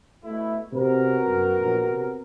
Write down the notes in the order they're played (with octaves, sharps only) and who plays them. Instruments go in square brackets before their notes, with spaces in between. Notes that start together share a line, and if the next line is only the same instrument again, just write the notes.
[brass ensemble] B2 A3 E4
[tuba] C3 [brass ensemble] B3 F#4 A#4
[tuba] F#2
A#1
C3